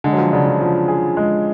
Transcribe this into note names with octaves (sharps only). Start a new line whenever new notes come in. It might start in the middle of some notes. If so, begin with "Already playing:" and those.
D3 G#3
F#3
F3
C#3 D4
D3
F3
G#4
G#3